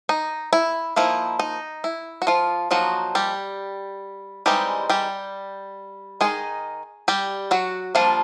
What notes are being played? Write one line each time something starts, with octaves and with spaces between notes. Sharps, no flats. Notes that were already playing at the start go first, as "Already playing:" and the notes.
D#4
E4
F3 A#3 D#4 E4
D#4
E4
F#4
F3 F4
F3 F#3 A#3 D#4 F#4
G3 G4
E3 G3 G#3 C4 D#4 G4
G3 G4
D#3 G#3 D#4 G#4
G3 G4
F#3 F#4
F3 G3 A#3 D4 F4